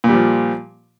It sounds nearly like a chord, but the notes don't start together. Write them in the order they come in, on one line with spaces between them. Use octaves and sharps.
A#2 G3 F3